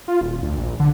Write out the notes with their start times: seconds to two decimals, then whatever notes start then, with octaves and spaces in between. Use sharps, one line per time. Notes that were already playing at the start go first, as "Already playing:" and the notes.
0.08 F4
0.21 D#1
0.42 D2
0.57 A#1
0.80 D3